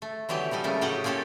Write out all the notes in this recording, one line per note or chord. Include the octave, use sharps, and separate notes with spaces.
A3
D3 E3 F#3 B3 G4
E3 F3 G3 D#4
C#3 A3 A#3
A2 F#3 D#4 G4 F#5
A#3 C#4 F4 G4 A4